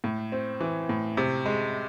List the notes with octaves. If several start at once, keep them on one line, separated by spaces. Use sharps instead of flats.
A2
C4
E3
A2
C3
G#3